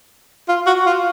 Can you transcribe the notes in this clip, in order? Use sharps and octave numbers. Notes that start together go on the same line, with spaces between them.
F4
F#4
F4